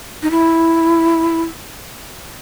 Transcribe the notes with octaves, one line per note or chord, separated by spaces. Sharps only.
D#4
E4